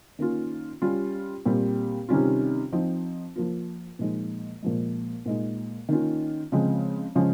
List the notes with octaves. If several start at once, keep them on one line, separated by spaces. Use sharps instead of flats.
D#3 A#3 C#4 F4
G3 C#4 F4
A#2 G3 C4
C3 D#3 G3 C#4 F4
F3 C4 D#4
F3 A#3 F4
A#2 F3 G#3 D#4
A#2 F3 G#3
A#2 G#3 D#4
D#3 A#3 C#4 F4
C#3 F3 G#3 C4
C#3 F3 G#3 C#4